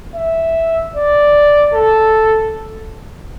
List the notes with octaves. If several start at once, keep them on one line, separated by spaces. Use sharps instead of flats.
E5
D5
A4